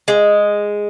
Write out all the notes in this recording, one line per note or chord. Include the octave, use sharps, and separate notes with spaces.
G#3